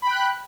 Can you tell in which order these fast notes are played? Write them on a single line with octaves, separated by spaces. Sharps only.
B5 G5 F#6